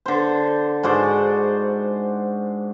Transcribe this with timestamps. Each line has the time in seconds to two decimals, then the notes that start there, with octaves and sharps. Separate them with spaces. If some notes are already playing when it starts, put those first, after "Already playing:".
0.06 D3 C5
0.83 G#2 F#4 C5 D5